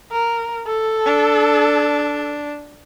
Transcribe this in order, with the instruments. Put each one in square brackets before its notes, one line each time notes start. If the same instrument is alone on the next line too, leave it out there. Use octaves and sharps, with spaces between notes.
[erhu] A#4
A4
[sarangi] D4